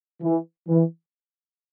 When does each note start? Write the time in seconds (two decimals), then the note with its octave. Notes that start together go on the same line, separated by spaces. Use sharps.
0.21 E3
0.67 E3